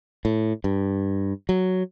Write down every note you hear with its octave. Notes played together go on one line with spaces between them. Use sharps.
A2
G2
F#3